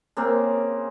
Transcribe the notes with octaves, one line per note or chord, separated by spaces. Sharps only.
C#3 A#3 C4